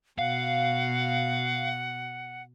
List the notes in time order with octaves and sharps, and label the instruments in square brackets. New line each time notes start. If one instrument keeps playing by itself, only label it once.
[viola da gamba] B2 [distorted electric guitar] F5 [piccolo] F#5